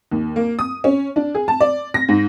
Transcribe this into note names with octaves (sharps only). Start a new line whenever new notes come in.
D#2
A#3
D#6
C#4
D4
G#4
A5
D5
A#6
G#2